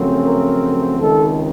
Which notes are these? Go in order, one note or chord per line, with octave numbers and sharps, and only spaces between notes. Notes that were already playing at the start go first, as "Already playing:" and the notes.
Already playing: F#2 C#3 F3 A3 C4
A#4
C#2 C3 D#3 A4